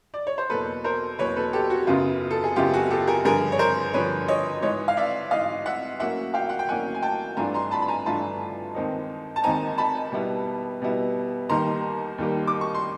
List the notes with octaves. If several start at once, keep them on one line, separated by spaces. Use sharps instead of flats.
D5
C#5
C5
E2 B2 F#3 A#3 A4 B4
A#4 C5
E2 B2 F#3 A#3 B4 C#5
A4 B4
G4 A4
F#4
F#2 C#3 F#3 B3 E4 F4
A4
G#4
F#2 C#3 F#3 B3 E4 F4 G4
F#4 G#4
G4 A4
G#4 A#4
G2 D3 F3 G#4 A#4
C#5
A#4 C5
G2 D3 F3 B4 C#5
C#5 D#5
G#2 E3 G#3 C#5 D#5
F5
D5 E5
G#2 E3 G#3 D#5 F5
E5 F#5
A2 F#3 A#3 C#4 E5 F#5
F5 G5
F#5
G5
A2 F#3 A#3 C#4 F#5 G#5
G#5
G5 A5
G2 E3 A3 D4 F4 G#5 A#5
A#5 C6
A5 B5
B5
G#5 A#5
G2 E3 A3 D4 F4 A5 B5
D#2 D#3 G#3 C4 D#4
A5
D#2 D#3 G#3 C4 D#4 G#5 A#5
A5 B5
B2 G3 B3 E4
B2 G3 B3 E4
D#2 D#3 G3 A#3 A#5 C6
D#2 D#3 G3 A#3
D6
C#6
C6